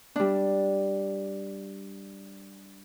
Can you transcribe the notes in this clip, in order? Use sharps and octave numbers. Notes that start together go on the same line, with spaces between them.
G3 D4